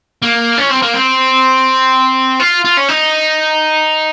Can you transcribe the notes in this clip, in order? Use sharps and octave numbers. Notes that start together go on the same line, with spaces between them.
A#3
C#4
C4
A#3
C4
F4
F4
C#4
D#4